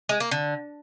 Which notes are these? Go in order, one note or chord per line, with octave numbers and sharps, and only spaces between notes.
G#3
A#3
D3